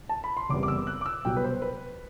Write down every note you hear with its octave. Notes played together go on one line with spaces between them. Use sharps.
A5
B5
C6
F#1 E2 C3 G3 B3 D6
D6
E6
F#6
D6
E6
C2 B2 F#3 G5
B4
C5
B4